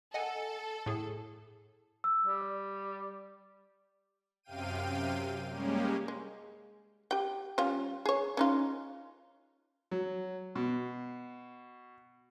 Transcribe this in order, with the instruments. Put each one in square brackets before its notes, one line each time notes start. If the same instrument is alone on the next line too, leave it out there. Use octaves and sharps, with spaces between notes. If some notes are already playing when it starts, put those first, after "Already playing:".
[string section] A4 [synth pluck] D#5 F#5 G#5
[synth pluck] A2 G#4
[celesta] E6
[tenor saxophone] G3
[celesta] D5
[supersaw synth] F#2 C3 F5 G5 D#7
G3 G#3 A#3 C#4 G4
[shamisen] G#3
G4 G5
G3 C#4 F4
G#4 C#5
C#4 D#4 F4
[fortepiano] F#3
B2